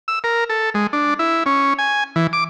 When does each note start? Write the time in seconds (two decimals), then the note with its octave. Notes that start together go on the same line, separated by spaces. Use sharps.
0.08 E6
0.24 A#4
0.50 A4
0.74 G#3
0.93 D4
1.19 E4
1.46 C#4
1.78 G#5
2.16 E3
2.33 D6